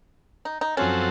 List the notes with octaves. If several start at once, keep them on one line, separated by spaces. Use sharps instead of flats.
D#4
D#4
F#2 F3 C4 C#4 F#4 A4